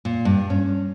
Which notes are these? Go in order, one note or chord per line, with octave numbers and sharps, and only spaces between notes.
A#2
G2
C#4